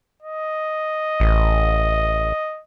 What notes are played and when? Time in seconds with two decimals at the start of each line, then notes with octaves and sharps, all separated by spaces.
0.22 D#5
1.20 A1